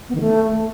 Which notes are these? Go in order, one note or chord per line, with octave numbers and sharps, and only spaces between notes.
B3
D#3
A3